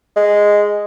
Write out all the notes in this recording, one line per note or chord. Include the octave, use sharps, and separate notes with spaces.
G#3